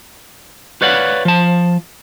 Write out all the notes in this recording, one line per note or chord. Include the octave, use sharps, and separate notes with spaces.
B4 C#5 D5 F5 F#5
F3 A5